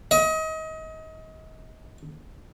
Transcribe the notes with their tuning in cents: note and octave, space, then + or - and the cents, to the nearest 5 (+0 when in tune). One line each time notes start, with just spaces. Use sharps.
D#5 +30